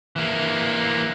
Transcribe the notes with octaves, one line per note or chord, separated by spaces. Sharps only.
E3 A#3